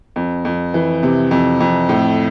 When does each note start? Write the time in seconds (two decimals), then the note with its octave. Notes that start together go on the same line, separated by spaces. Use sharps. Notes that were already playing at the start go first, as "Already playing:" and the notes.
0.16 F2
0.45 F2
0.74 E3
1.03 C3
1.31 F2
1.60 F2
1.89 A2